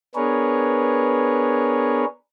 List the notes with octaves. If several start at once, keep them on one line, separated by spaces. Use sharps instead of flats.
B3 D4 G#4 A#4 B4 C#5